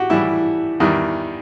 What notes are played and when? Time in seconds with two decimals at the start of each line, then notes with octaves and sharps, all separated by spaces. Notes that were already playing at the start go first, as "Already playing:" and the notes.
Already playing: F#4 G4
0.10 A2 E3 G3 E4
0.80 E2 D#3 G3